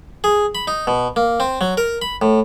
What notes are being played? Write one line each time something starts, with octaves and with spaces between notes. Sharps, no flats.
G#4
B5
D#4
B2
A#3
C4
F#3
A#4
B5
A2